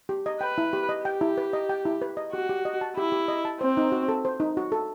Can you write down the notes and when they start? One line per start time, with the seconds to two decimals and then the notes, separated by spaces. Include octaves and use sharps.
0.09 G4
0.26 D#5
0.41 B4 G5
0.58 E4
0.73 G4
0.89 D#5
1.05 G4 G5
1.21 E4
1.37 B4
1.53 D#5
1.69 G5
1.85 E4
2.02 B4
2.17 D#5
2.33 F#4 G4
2.49 G4
2.65 D#5
2.81 A5
2.97 E4 G4
3.12 G4
3.28 D#5
3.45 A5
3.60 C4 C5
3.77 D#4
3.92 F#4
4.08 A4
4.25 C5
4.40 D#4
4.57 F#4
4.72 A4